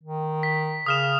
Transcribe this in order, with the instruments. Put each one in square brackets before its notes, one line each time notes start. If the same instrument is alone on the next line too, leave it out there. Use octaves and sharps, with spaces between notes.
[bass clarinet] D#3
[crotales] B6
[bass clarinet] C#3 [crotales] D#6 F6 E7